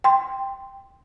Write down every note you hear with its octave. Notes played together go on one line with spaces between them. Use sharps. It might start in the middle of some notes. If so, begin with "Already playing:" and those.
G5 C6